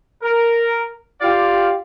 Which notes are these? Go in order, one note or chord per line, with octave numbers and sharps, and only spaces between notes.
A#4
F4 G4 D5 F5